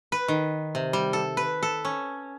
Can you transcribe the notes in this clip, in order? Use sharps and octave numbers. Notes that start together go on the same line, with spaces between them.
B4
D#3
C3
G3
A4
B4
A4
C#4